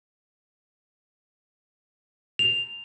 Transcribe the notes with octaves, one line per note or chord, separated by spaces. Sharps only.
F7